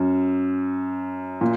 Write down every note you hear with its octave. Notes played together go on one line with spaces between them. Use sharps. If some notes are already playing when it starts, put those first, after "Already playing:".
Already playing: F#2
A#2